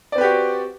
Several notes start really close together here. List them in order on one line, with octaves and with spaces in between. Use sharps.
D5 C4 B4 G4 F#4